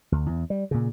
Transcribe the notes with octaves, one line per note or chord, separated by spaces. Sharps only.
D2
E2
G3
A#2 C#3